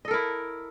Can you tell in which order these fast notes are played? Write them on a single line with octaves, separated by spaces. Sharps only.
D#5 A4 A#4 E4